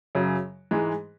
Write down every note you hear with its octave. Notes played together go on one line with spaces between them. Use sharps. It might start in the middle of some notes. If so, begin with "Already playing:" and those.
F#2 C#3 F#3
G#2 E3 G#3